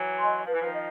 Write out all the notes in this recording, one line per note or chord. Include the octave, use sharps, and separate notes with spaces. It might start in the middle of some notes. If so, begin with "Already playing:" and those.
Already playing: E3 F#3
D#5 G#5 C6
F3 B4
E3
D#3 F3
D#5